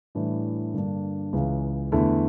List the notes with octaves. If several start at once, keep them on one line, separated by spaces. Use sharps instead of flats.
A2 E3 G3 D4
G2 D3 G3 A#3 D4
C#2 C#3 E3
E2 D3 A3 E4